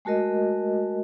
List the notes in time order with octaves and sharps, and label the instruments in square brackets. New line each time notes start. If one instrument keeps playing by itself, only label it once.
[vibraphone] G#3 A3 F#4 A#4 D#5